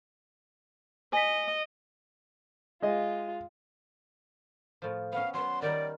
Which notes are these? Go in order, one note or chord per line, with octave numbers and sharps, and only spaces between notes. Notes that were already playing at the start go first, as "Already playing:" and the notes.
D#5 G#5 B6
G#3 F4 D#5
A2 F3
B3 C#4 F5
F#3 B3 C6
D#3 G3 A#4 D5